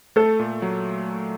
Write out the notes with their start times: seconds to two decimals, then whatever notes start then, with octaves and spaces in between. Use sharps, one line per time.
0.16 A3 A4
0.39 A#2
0.62 F#3